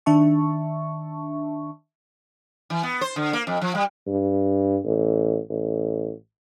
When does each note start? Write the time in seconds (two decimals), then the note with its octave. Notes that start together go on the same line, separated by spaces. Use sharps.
0.06 D#3 D4 E5 A5 C#6
2.70 E3
2.83 B3
3.01 C5
3.16 D3
3.33 A#3
3.47 F2
3.62 F3
3.75 G3
4.07 G2
4.85 A1
5.50 A1